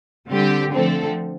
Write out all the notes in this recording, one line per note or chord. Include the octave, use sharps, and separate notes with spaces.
D3 G3 C4 G4
D3 F3 A3 C4 A4